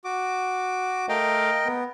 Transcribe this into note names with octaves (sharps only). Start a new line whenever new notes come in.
F#4 D6
A3 A#4 D#5 F5 G5
B3